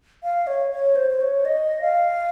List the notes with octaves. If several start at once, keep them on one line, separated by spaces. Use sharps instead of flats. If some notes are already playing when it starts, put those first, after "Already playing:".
F5
C#5
C#5
C5
C5
C#5
D#5
F5